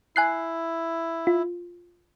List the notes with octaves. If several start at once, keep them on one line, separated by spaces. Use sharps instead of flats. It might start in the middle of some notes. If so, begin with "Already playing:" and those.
E4 G#5 F#6 C7
F4